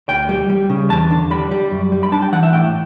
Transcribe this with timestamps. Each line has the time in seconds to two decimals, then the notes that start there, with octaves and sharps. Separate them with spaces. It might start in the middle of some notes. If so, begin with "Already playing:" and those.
0.09 D2 G5
0.29 G3
0.50 G3
0.70 C#3
0.90 E2 A5
1.10 D3
1.31 G3 B5
1.51 G3
1.71 F#2
1.92 G3
2.03 B5
2.12 D4 A5
2.22 G5
2.32 E3 F#5
2.43 E5
2.52 A2 G5